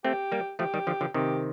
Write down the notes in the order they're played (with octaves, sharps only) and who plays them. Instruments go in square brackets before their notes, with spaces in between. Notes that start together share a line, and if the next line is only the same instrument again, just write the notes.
[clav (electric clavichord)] A3 C4 [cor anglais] G4
[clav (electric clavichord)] G3 A#3
[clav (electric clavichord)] F3 A3 [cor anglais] G4
[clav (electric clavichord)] D#3 G3
D3 F3
D3 F3
[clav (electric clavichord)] C3 D#3 [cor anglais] G4